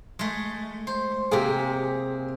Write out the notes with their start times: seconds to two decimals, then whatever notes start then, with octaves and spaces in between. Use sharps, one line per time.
0.19 G#3 A3
0.87 C5
1.31 C3 A#3 G4 G#4